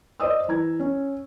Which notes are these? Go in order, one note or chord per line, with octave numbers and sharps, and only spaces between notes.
C5 D5 D#5 D#6 E6
E3 A#5 G#6
C#4